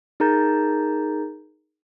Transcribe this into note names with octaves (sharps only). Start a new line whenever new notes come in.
D#4 G#4 A#4 A#5 G6 A6